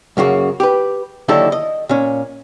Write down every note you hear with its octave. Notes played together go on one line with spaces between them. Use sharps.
F#2 C#3 A#3 F#4
G4 B4
D#2 D3 F#3 D#4 E4 A4
D#5
A#2 C#4